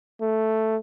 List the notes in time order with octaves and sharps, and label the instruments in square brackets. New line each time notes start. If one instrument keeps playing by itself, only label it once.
[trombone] A3